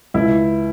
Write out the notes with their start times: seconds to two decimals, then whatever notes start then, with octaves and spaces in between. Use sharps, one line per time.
0.14 C#2 E4